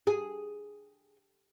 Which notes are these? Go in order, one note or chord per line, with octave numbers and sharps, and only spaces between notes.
G#4